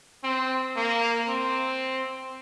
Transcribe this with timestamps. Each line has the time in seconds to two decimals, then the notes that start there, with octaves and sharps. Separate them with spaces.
0.24 C4
0.76 A#3
1.29 C4